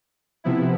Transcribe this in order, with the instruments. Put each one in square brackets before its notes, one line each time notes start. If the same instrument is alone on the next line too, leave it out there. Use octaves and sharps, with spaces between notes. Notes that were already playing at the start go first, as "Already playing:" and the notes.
[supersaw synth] C3 F3 B3 E4